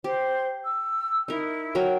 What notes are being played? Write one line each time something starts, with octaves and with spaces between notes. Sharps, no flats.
G4 C5
E6
D#4 E4 A#4
F#3 A#4 G5